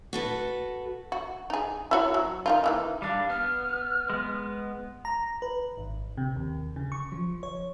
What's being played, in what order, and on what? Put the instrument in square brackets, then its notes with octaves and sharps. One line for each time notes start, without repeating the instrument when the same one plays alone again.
[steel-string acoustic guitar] F#4 A4 B4
[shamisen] F#4
D#4 G#4
E4 F#4 C#5
F#3
D#3 D#4 F4
D#3 E3 A#3
[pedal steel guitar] G3 D4 [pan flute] F5
[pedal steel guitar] B3 [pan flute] F6
[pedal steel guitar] G#3 B3
[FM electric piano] A#5
B4
G#1
C3
D#2
C#3
C#6
F3
C#5